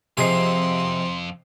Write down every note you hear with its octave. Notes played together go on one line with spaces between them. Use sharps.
F2 C3 F3 G#4 D#5 G#5 C6 C7